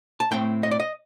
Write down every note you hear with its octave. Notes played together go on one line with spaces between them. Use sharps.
A5
A2 A3 C4 G5
D#5
D5
D#5